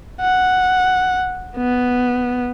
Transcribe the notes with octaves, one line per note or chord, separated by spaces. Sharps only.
F#5
B3